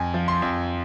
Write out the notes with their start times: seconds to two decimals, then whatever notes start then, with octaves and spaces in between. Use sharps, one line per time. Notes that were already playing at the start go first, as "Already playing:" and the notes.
Already playing: F2 G#5
0.14 F3
0.28 C6
0.42 F2